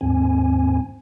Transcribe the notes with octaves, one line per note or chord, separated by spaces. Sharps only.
D#2 G#2 C4 G#5